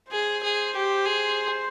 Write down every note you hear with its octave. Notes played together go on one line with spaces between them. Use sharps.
G#4 C5
G#4
G4
G#4